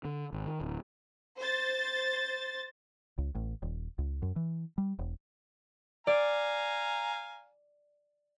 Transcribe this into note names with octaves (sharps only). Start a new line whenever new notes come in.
D3
G#1
D#3
D1
C5 A6
C#2
A1
D#1
C#2
F#2
E3
G3
E1
D5 F5 G#5 A#5